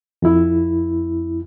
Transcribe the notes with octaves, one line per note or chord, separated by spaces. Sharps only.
F2 E4